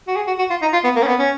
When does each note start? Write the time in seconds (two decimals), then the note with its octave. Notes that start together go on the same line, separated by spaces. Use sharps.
0.08 F#4
0.16 G#4
0.27 F#4
0.39 F#4
0.50 F4
0.62 D#4
0.73 F4
0.84 B3
0.96 A#3
1.03 C#4
1.07 B3
1.20 C#4